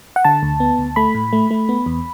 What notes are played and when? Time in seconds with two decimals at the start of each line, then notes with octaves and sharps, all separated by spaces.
0.16 F#5
0.25 D3 A5
0.43 D2
0.60 B3
0.78 D2
0.96 A3 B5
1.14 A2
1.33 A3
1.50 A3
1.69 B3
1.86 E2